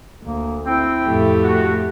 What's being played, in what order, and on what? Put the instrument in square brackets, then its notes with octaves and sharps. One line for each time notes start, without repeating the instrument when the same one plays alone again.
[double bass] D2 [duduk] A#3
[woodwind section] C4 G5 [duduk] E4
[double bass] F2 A2 [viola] A3 G4
[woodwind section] F#4